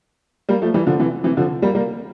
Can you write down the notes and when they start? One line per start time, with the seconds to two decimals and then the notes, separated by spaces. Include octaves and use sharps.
0.49 G3 A#3
0.62 F3 A3
0.74 E3 G3
0.86 D3 F3
0.99 C3 E3
1.24 C3 E3
1.37 D3 F3
1.62 G3 A#3
1.75 G3 A#3